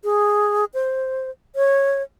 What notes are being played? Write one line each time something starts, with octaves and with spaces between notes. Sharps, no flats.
G#4
C5
C#5